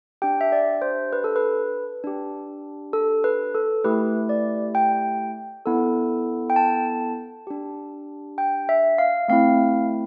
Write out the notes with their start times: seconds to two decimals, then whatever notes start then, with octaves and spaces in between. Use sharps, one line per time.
0.22 D4 G4 G5
0.41 E5
0.52 D5
0.82 C5
1.13 B4
1.24 A4
1.36 B4
2.04 D4 G4
2.93 A4
3.24 B4
3.54 A4
3.84 A3 E4 G4 B4
4.29 D5
4.75 G5
5.66 B3 E4 A4
6.50 G5
6.56 A5
7.47 D4 G4
8.38 G5
8.69 E5
8.98 F5
9.28 A3 C4 E4 F5